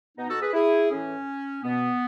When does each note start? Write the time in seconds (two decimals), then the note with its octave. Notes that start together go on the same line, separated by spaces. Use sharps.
0.17 B2 B3 D#4
0.29 F#4 A4
0.41 G#4 B4
0.53 E4 G#4
0.90 A2 E3 C#4
1.63 B2 B3